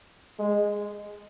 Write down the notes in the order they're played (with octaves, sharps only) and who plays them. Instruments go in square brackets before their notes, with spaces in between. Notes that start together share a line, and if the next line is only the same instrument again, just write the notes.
[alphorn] G#3